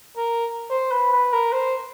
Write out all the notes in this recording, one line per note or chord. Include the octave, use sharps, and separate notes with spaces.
A#4
C5
B4
B4
A#4
C5